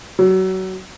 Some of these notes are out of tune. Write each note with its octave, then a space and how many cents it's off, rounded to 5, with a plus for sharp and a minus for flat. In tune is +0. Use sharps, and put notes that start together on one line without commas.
F#3 +25